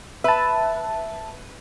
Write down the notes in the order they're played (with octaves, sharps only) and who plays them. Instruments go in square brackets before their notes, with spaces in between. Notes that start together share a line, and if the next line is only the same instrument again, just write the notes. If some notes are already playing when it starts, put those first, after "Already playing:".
[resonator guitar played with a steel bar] B4 [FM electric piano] E5 A5